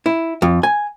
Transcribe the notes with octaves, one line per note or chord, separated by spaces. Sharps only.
E4
F2
G#5